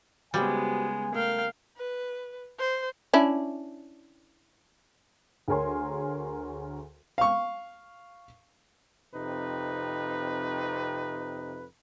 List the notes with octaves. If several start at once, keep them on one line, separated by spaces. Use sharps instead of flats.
C#3 G3 G#3 B3 F#4 G4 C5 G#5
A3 A#4 F5 G5
B4
C5
C#4 D4 E4
D2 G#4 A#4 C#5 G#5 C6
F5 C#6
F2 C3 D#4 B4